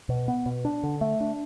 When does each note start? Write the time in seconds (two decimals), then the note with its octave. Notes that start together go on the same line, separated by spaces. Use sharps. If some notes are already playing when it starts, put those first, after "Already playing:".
0.09 B2
0.28 B3
0.46 B2
0.65 D4
0.83 D3
1.01 A3
1.20 D4